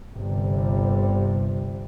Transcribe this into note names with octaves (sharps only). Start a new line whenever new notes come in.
G1 C3 G3